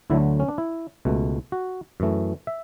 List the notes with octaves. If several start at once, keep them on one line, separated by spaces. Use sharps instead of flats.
D2 D3 F#3 A3 E4
C#4
D4
E4
C#2 B2 A3
F#4
F#2 E3 A3
E5